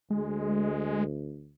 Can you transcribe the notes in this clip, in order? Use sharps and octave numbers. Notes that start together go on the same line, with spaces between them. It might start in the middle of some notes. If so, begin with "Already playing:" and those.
D2 G#3